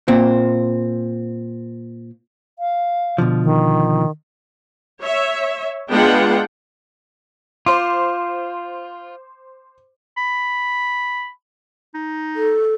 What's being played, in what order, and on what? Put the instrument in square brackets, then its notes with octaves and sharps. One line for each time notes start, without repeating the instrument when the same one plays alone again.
[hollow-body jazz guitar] A#2 C4
[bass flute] F5
[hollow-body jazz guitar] B2 D3 F3
[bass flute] D#3
[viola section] C#5 E5
G#3 B3 D4 F4 F#5 G5
[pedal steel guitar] F4 [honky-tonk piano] C5 D6
[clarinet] B5
D#4
[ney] A4